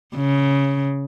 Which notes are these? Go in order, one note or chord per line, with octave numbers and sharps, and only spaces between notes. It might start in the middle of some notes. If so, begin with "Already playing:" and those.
C#3